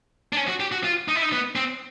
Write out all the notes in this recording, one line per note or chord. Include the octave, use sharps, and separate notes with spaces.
D4
C#4
F#4
G4
F#4
F4
D#4
E4
D#4
B3
C4